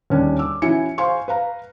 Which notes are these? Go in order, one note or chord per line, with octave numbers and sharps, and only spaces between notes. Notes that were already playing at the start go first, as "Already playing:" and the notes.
D#2 G3 C#4 D4
D6 E6
E3 C#4 E4 F#4 G#5 C#7
C5 F5 G#5 C6 C#6
B4 F5 A#5